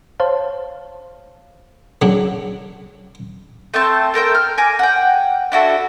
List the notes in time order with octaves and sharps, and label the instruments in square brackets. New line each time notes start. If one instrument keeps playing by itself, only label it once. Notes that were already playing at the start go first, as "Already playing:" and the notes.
[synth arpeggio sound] C5 C#5 F5 A5
[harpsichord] C#3 F#3 D4
[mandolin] A3 C4 C5 A5
A3 A#4 C5 G5
F6
G#5 A#5 D6
F#5 G5
D4 E4 F#4 A4